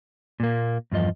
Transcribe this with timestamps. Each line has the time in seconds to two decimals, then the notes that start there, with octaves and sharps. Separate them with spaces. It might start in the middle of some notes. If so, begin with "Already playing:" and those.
0.40 A#2 A#3
0.92 E2 G2 F3 D#5